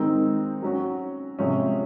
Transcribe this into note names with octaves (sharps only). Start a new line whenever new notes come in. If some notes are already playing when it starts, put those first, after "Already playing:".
Already playing: D#3 G#3 C4 D#4
F#3 C#4 F#4
C3 F3 G#3 C#4